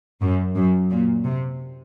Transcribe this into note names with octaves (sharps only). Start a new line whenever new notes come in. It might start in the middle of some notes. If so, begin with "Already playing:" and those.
F#2
F#2
A#2
C3